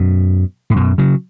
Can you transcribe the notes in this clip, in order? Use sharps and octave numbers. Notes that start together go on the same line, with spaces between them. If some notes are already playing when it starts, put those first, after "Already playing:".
Already playing: F#2 B2
A2
F#2 B2
C#3 F#3